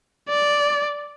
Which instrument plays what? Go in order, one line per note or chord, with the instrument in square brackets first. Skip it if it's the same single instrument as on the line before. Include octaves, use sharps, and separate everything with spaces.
[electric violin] D5